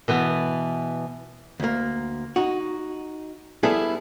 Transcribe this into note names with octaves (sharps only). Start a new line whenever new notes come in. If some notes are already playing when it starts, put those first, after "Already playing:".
B2 E3 B3
D2 A#3
D#4 F#4
G3 B3 E4 G#4 A4